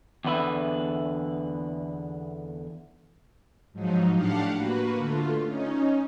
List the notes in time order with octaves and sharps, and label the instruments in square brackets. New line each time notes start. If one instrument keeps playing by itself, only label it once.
[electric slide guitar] E2 D3 B4 E5
[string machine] G#2 F3 F#3 D#4
A2 D4 G4 F5 F#5
A#3 F#4 B4
D3 A3 F4
C#4 D#4